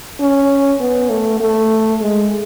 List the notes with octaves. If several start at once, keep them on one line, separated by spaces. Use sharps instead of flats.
C#4
B3
A3
A3
G#3